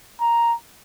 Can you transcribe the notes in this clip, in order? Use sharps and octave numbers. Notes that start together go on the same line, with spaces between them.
A#5